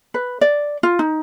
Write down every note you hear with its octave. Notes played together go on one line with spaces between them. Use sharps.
B4
D5
F4
D#4